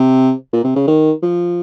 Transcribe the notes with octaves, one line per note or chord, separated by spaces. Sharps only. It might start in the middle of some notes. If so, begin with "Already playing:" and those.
Already playing: C3
A#2
C3
C#3
D#3
F3